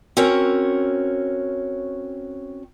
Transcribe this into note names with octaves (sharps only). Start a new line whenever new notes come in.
C4 C#4 F#4 A#4 C#5